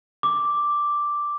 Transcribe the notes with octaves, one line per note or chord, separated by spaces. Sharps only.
D6